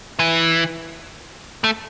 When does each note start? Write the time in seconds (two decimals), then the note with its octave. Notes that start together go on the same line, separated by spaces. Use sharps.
0.19 E3
1.64 A3